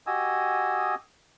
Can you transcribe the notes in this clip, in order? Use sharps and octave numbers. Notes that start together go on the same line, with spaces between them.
F#4 G4 D#5 G#5 D#6 E6